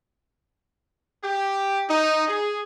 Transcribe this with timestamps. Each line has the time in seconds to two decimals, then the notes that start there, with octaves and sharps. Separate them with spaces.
1.23 G4
1.89 D#4
2.28 G#4